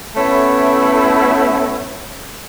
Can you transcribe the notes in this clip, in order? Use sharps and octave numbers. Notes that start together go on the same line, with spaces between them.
A3 B3 C#4 E4